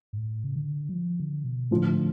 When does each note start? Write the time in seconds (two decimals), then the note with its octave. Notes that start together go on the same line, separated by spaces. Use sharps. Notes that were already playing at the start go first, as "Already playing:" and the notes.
0.13 G#2
0.18 A2
0.44 C#3
0.56 D3
0.89 F#3
0.94 F3
1.20 D3
1.45 B2
1.70 A2 D3 F3 A3